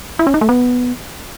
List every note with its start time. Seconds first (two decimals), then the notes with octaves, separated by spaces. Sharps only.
0.19 E4
0.27 C#4
0.34 D#4
0.41 A3
0.49 B3